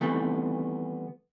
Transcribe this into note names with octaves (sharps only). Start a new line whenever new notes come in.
D#3 E3 G3 A3 B3 C4